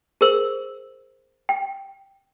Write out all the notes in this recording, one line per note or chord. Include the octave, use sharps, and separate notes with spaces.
G#4 A#4 C5 E6 F#7
G5